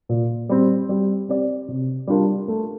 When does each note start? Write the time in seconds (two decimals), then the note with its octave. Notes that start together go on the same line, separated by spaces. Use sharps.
0.09 A#2
0.49 G3 C4
0.89 G3
1.29 C4 G4 D5
1.68 C3
2.07 G3 D4 F4 A#4
2.48 A3